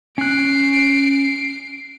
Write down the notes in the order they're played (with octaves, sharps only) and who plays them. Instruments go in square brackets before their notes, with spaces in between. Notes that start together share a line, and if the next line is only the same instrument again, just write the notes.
[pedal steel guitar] C#4 F#6 [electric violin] C7 D7